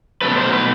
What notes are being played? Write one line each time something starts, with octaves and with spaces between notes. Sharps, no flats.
B2 F#3 A3 B4
C5
B4